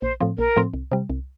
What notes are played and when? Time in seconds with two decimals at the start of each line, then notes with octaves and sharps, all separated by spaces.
0.02 A#1 C5
0.20 A2 F3 C4
0.38 A#1 A#4
0.56 A2 F3 C4
0.74 C2
0.92 C3 G3
1.10 C2